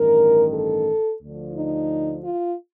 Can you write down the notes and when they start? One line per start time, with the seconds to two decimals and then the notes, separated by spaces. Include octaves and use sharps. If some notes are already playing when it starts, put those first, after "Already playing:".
Already playing: A1 G2 D#3 A#4
0.51 A4
1.20 D2 D3 F3
1.54 D#4
2.23 F4